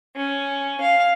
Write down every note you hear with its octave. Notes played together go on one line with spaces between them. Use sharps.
C#4
F5